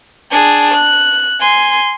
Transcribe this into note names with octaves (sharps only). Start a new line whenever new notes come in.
D4 G#4
F#6
G#5 C6